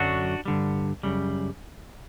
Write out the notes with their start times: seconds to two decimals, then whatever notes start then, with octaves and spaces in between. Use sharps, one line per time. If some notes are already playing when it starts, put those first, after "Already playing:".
Already playing: F#2 D3 F#3 D4 F#4
0.45 G2 D3 G3
1.03 F#2 C#3 G3